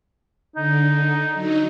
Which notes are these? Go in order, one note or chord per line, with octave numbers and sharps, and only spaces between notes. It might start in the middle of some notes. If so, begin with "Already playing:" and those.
D3 D#4
F#3 D#4